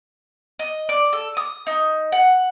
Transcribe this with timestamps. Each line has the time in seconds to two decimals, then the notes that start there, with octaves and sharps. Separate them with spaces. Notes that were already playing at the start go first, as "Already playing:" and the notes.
0.59 D#5
0.89 D5
1.13 A4
1.37 D#6
1.67 D#4
2.12 F#5